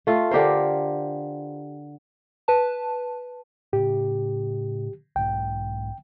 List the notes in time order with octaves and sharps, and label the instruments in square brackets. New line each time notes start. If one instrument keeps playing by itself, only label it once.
[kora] A3 F4
D3 G4 A#4 C5
[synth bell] B4 A5
[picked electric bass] A2 C#3 [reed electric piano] G4
[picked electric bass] B1 G#2 [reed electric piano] G5